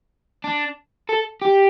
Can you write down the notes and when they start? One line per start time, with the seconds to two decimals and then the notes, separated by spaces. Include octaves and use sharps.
0.44 D4
1.09 A4
1.42 G4